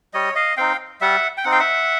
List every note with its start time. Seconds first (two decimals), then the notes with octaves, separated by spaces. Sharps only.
0.14 G3 C#5 D#5
0.35 D#5 F5
0.57 C4 D#4 F5 G5
1.01 G3 E5 F#5
1.38 G5
1.44 C4 D#4 F#5
1.52 F5 G5
1.59 E5 F#5